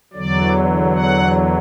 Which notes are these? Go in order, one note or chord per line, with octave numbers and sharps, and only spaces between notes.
E2 D3 F#3 D5
F#5